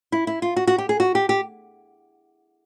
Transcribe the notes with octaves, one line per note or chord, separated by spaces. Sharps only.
E4
E4
F4
F#4
F#4
G4
G#4
F#4
G4
G4